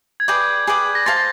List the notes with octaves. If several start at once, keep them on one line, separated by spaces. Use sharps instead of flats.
G#6
G#4 B4 D5 G5 G6
G#4 B4 D5 G5
A#6
C5 F5 A5 C6 A6
A6